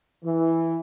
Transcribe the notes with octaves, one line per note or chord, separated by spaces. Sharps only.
E3